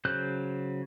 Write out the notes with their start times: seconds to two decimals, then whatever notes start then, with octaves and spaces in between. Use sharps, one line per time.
0.05 C#3 F#3 C5 F#6 G6